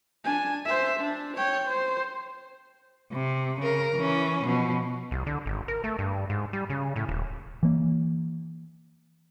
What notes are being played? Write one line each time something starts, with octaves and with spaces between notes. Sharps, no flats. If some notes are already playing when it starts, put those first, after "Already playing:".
D4 G#5
C5 E5
D4
C#5 G5
C5
C3
C#3 A#4
E3 C#4
B2 F3
C2
D3
G#1
A#4
A3
G2
G#2
G3
C#3
A2
D#1
E3 A#3